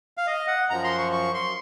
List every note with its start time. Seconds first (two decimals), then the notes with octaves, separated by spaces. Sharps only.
0.17 F5
0.27 D#5
0.48 F#5
0.70 F#2 F3 A#5
0.84 C6
0.98 C#6
1.13 C#6
1.34 C6